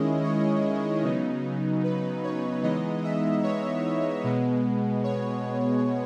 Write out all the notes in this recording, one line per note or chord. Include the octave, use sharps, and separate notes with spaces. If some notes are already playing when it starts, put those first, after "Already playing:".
Already playing: D#3 G#3 C#4 E4 D#5
C#5
C#3 F#3 B3 D#4
B4
C#5
E3 G#3 B3 D#4 D#5
E5
C#5
B2 G#3 B3
C#5